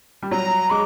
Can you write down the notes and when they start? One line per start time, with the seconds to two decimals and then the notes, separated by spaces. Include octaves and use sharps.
0.22 G3
0.31 F#3 A#5
0.70 G#3 D6